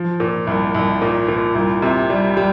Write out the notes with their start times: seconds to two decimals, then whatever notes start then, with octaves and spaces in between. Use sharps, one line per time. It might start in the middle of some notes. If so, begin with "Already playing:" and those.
Already playing: F3
0.20 A#2
0.47 C2
0.75 C2
1.02 A#2
1.29 A#2
1.55 C2
1.82 C3
2.10 G3
2.37 G3